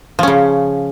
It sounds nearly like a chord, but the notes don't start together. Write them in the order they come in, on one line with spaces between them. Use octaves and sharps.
F3 C#4 C#3